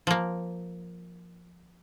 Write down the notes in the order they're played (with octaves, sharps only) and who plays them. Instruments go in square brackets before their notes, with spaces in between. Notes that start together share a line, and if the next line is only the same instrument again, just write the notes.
[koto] F3 A#3